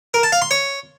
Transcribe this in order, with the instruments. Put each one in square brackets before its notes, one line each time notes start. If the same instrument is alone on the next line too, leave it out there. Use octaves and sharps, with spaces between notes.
[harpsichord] A#4
A5
F5
C6
C#5